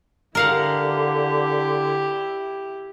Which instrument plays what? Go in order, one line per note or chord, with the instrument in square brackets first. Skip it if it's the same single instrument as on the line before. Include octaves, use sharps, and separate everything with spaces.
[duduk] D3 [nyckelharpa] E4 G4 [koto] A#4 F5 F#5